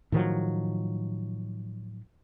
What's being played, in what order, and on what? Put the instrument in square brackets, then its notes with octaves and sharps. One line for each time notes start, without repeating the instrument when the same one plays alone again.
[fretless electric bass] A2 D#3 F3 F#3